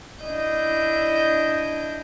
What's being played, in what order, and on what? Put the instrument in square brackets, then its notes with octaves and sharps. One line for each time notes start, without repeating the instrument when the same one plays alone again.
[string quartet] D4 E4 D#5 G6